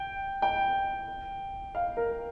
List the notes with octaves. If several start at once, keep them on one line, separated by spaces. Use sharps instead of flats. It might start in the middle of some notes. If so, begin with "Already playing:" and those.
Already playing: G5
G5
F5
A#4